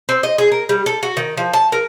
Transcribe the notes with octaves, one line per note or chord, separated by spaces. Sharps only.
C4
D#5
G#4
A#4
G3
A4
F#4
D#3
F3
A5
A#4